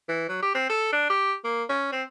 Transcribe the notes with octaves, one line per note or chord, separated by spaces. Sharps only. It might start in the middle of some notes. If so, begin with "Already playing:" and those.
E3
F#3
G4
C4
A4
D4
G4
A#3
C#4
C4